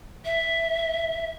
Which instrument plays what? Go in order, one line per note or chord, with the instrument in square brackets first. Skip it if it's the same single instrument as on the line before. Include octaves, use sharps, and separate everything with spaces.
[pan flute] E5